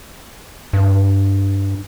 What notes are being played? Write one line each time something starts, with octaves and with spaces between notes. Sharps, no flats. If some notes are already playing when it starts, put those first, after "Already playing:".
G2